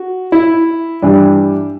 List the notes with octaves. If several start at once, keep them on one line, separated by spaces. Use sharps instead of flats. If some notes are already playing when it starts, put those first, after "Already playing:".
Already playing: F#4
E4
G2 E3 G3 D4